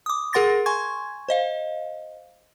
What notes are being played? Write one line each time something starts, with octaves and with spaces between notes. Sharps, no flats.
D6 D#6
G#4 A#4 F#5 C6 A6 A#6
G#5 C6 C#6 G#6
C5 D#5 F5